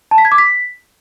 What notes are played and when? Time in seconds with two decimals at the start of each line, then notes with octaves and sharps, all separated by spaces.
0.11 A5
0.18 B6
0.25 G#6
0.32 D6
0.38 B6